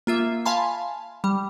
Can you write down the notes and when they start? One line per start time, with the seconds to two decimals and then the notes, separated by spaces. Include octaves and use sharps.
0.07 A#3 F4 E5
0.45 F5 G#5 A5 B5 C6
1.24 G3